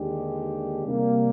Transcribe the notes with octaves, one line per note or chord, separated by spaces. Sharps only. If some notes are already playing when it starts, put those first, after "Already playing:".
Already playing: D#2 D3 G#3 D4 G4
C3 G3 A#3